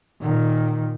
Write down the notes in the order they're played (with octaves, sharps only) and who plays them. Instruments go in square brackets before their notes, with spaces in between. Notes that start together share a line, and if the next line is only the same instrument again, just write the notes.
[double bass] A#2 D#3